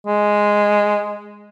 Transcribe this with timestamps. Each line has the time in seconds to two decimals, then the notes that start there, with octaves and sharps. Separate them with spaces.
0.07 G#3